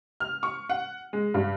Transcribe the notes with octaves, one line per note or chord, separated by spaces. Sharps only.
F6
C#6
F#5
G#3
G2